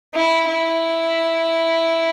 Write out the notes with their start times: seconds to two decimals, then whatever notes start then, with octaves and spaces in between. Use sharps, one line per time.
0.15 E4
0.48 E4